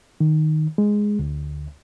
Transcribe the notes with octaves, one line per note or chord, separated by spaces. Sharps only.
D#3
G#3
D2